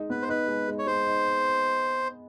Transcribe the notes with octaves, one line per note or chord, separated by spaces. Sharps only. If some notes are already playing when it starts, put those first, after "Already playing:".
Already playing: G#3 D#4
B3 B4
C5
D#4 B4
G#3
G#3
C#5
G#3 C5
D#4